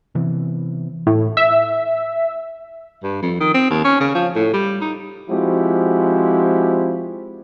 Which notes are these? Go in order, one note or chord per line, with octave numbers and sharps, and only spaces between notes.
C3 E3 B3
A2
E5
G2
F2
D#3
C4
D#2
C#4
C#3
F3
A2
G3
D#4
F3 G#3 C4 E4 F#4 G4